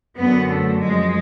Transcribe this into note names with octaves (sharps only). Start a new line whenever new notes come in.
F#2 D3 F#3 B3
A3
F#2 F3 G#3